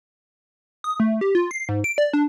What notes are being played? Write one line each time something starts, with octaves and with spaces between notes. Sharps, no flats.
D#6
A3
G4
F4
C7
G#2
D7
D5
D4